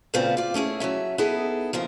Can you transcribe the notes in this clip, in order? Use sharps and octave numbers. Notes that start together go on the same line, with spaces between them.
A#2 C#3 A3 B3 C4 F4
F4 D5
A3 C#4 E4 G#4
F#3 A3 C#4 E5
B3 D#4 E4 G#4 A4
D#2 C#3 F3 A#4